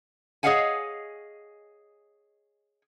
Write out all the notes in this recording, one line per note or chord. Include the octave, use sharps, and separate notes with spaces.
G#4 C#5 D#5 F5 F#5 G#5